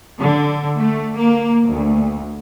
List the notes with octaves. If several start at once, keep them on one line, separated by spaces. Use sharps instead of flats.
D3
A3
A#3
D2